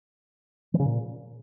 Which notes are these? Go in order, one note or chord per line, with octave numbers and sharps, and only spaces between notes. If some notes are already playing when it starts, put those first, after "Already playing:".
E3
C#3
A#2